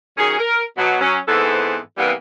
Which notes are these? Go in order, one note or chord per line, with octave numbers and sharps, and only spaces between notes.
D#3 F#3 C#4 G#4
A#4
B2 F#3
F#3 C#4
G#2 E3 B3 C4 A4 C5
C3 E3 G3 A#3 B3